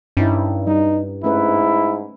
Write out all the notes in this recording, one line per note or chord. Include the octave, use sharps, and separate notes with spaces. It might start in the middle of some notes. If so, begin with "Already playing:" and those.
G2 C#4 D#4 E4
G3 D#4
G#2 A3 C#4 E4 B4